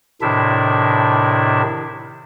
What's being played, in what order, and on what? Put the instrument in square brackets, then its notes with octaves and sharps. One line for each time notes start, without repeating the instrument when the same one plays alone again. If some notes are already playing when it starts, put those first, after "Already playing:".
[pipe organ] A2 C3 D#3 D4 E4 E5